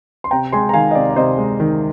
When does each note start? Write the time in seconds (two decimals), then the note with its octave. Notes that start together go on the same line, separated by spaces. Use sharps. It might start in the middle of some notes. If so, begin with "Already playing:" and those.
0.24 C6
0.31 C3 G5 A#5
0.53 G#3 G#5 C6
0.69 A#5
0.74 D#3 F5 G#5
0.91 D#5
0.95 C3 D5 F5
1.10 D5
1.16 C3 C5 D#5
1.38 G#3
1.60 D#3